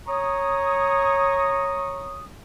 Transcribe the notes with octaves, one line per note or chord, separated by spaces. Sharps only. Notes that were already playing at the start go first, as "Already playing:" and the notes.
C#5 A#5 C#6 D#6